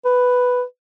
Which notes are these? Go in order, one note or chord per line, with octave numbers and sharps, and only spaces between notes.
B4